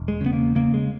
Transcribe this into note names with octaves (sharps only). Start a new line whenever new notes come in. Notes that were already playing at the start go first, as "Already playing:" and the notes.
Already playing: E1
G#3
C#3
B3
A#3
C#3 A#3
G#3